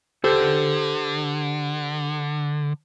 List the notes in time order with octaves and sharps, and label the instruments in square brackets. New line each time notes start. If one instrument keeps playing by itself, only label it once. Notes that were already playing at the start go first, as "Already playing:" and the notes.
[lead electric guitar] D3 [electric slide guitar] G4 A4 C5